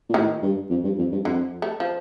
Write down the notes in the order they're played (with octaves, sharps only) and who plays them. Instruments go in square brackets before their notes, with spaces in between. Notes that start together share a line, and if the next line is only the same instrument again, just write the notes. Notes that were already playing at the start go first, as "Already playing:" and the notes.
[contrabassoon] A#2
[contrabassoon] A2 [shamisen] D#3
[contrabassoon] G2
F2
G2
F2
G2
[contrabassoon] F2 [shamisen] D3
[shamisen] A3
F3